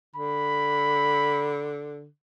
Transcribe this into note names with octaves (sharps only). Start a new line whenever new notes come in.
D3 B5